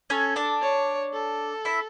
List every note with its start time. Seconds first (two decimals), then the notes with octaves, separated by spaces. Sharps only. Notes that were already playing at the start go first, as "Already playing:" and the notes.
0.10 C#4 A4 C#5
0.36 D4 D5
0.62 C#5
1.13 A4
1.65 E4 E5